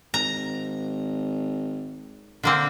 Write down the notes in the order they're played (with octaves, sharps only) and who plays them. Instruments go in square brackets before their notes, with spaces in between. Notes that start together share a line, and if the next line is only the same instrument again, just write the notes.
[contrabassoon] G#1 [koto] A#5
[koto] D3 A#3 C4